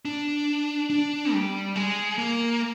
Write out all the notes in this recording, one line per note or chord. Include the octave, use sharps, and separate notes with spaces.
D4
D4
G3
G#3
A#3